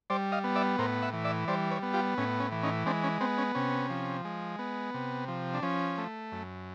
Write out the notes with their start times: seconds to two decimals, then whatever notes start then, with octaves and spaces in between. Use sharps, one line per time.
0.10 G3 C5 D5
0.32 D#5 F5
0.44 B3
0.56 D5 E5
0.78 A2 A#4 C5
1.02 E5 F#5
1.13 E3
1.24 D5 E5
1.48 G3 C5 D5
1.71 B4 C#5
1.83 B3
1.94 F4 G4
2.18 A2 C#4
2.40 C#4
2.52 E3
2.63 C#4 D#4
2.86 G#3 C4 D4
3.03 C#4
3.20 B3 C4
3.38 C#4
3.55 C3 C#4
3.90 F3
4.25 G#3
4.59 B3
4.94 C3
5.28 F3
5.54 D4
5.62 F3 C#4
5.98 A3
6.32 F#2